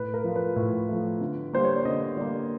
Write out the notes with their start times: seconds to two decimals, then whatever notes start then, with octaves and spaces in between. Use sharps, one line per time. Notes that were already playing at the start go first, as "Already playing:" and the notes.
Already playing: A2 B4
0.14 A#4
0.24 F3 A3
0.36 B4
0.56 A2
0.89 F3 A3
1.21 D3
1.53 G3 A#3 C5
1.64 C#5
1.75 D5
1.85 D3 D#5
2.17 G3 A#3 D5